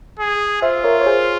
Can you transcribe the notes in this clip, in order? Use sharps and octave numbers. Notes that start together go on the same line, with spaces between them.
G#4
F4 C5 E5
A#4 C#5
C#5
G#4 C5